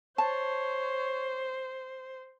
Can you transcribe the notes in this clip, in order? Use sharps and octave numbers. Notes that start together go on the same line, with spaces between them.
C5 C#5 A5